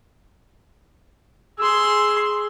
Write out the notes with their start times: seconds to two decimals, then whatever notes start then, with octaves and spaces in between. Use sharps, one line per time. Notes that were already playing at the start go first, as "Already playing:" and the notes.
1.59 G#4 C6 E6